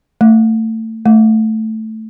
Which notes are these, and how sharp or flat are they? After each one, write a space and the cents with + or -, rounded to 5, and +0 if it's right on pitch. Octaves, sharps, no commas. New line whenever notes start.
A3 +25
A3 +0